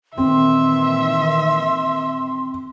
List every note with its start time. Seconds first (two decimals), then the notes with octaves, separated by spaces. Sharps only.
0.18 A#2 D#3 E3 C4 E5 C6